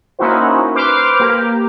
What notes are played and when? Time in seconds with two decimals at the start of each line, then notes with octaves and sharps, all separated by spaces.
0.19 A#3 C#4 D#4 E4 F#4 C5
0.75 B4 C5 D6 F6
1.20 A#3 G4